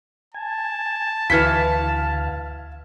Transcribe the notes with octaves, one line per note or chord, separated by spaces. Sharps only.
G#5 A5
D2 E3 F#4 C5 F5 F6 G#6 B6